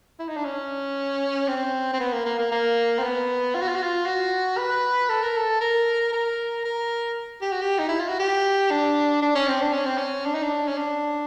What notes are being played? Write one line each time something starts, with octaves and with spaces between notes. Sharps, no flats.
E4
D#4
D4
C#4
C4
C4
B3
A#3
A#3
A#3
A#3
C4
B3
F4
F#4
F4
F#4
F4
F#4
B4
A4
A#4
A4
A#4
A#4
A#4
G4
F#4
G4
D#4
E4
F4
F#4
G4
D4
D4
C#4
C4
D4
C#4
C4
C#4
D4
D#4
D4
C#4
D4